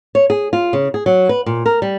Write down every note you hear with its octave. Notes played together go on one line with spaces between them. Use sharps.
C#5
G#4
F4
C#3
G#4
F#3
B4
A#2
A#4
G3